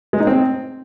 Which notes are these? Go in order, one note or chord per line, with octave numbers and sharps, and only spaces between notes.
G#3
D#4
C4